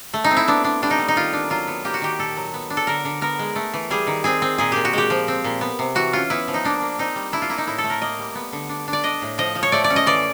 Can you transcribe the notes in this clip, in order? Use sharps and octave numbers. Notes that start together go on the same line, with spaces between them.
A3
D#4
C4
E4
B3 D4
D4
G3 D4
D#4
G3
D#4
D#3 F4
D4
F#3 F4
B3
A#3 G4
F#4
D#3 G4
A#2 A4
F#3
B3
D4
A4
D3 A#4
D3
B3 A#4
G#3
A3
E3
G3 G#4
D#3
C4 G#4
C4
A#2 G#4
A#2 G4
F#4
G#3 G4
F3
C4
A#2
B3
C3
E3 F#4
C#4 F4
B3 E4
F3
D#4
A#3 D4
A#3
C4 D#4
G3
D4 E4
F4
A#3 E4
D#4
A2 E4
A4
A3
A#4
A#3 D#5
G3
B3
D3
D4
D4
D5
D4 D#5
A2
F3 D#5
F3
C#5
A3 D5
D5
C#4
D#5
E3 D5